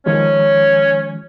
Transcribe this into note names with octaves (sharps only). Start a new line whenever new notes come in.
D#3 F3 G#3 C#4 C#5